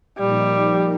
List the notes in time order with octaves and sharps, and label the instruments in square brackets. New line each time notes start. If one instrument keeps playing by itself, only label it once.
[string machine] A#2 F3 A#3 D#4 [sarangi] G3